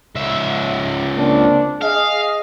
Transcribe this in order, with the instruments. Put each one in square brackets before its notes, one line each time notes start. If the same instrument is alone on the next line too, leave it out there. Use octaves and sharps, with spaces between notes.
[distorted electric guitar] C#2 E5
[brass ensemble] A#3 C4 D4
[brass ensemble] G#4 D#5 [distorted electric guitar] F5